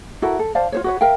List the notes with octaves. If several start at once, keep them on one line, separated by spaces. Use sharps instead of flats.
E4 F#4 A4 A#4
A4
C5 D5 F5 A5
F4 C5 C#5
F#4 B4 C#5
A#4 E5 F5 G5